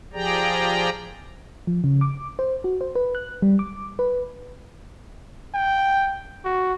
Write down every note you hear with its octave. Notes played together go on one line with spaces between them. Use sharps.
F3 G4 G#4 D5 G5 A#5
F3
C#3
D6
C5
F#4
C5
B4
F#6
G3
D6
B4
G5
F#4